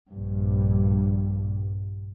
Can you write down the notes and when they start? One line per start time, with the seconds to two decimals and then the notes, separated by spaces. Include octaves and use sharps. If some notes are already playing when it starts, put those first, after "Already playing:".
0.11 A#1 G2